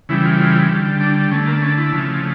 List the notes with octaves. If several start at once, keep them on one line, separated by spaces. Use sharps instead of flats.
C#3 E3 G3 E4
F4
F4
D3 G3
D4
D3 A3 C#4
A#3
C#4
E4
C#3 F3 A3